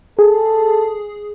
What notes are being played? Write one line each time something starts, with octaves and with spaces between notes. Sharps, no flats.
G#4 A4